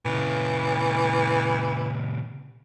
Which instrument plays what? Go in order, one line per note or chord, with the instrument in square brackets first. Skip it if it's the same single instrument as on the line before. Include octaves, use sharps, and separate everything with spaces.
[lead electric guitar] A#2 C#3 [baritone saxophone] E3